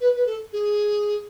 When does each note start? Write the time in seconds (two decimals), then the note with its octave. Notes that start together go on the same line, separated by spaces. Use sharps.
0.01 B4
0.16 B4
0.26 A4
0.53 G#4